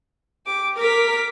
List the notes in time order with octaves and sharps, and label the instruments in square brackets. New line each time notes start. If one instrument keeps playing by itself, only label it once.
[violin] G4 D6
[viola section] A#4 [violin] D6 B6